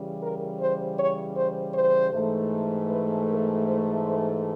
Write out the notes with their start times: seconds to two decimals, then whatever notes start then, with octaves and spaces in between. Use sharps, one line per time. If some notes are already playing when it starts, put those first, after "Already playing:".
Already playing: C#3 E3 G3
0.22 A#4
0.60 C5
0.99 C#5
1.37 C5
1.74 C5
2.13 G#2 E3 A3
2.89 B4
3.28 A#4
3.66 C5
4.04 C5